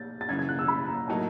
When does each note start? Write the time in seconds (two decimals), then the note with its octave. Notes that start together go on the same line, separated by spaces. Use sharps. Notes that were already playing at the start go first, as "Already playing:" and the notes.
Already playing: G6 A6
0.21 A6
0.29 F#2 C#3 E3 G#6
0.39 G#6
0.49 F#6
0.59 E6
0.68 B5
0.88 A#5
1.08 A2 F#3 A#3 D#4 A5